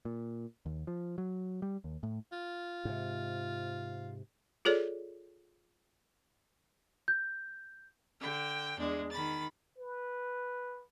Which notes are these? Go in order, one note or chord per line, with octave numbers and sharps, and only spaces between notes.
A#2
D#2
F3
F#3
G3
D#2
A2
F4
G#2 C3
F4 G#4 A4 C#5 D5
G6
D3 G5
E2 G#3 D4
D#3 B5 A6
B4